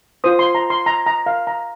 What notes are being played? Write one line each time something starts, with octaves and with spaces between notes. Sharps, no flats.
F4 C5 D#6
C6
A#5
C6
A#5
A#5
F5
A#5